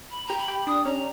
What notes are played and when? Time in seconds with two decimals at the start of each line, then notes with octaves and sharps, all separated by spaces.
0.11 B5
0.27 G4 A#5
0.38 B5
0.48 G4
0.67 D4 D#6
0.85 C#4 A#5